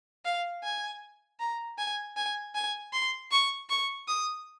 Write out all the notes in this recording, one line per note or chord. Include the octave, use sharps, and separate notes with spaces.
F5
G#5
A#5
G#5
G#5
G#5
C6
C#6
C#6
D#6